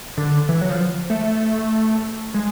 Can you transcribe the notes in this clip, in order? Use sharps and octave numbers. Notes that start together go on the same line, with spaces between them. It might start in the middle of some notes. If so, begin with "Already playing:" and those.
D3
E3
F#3
F3
A3
G#3